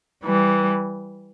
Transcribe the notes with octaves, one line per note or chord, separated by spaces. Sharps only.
E3 G3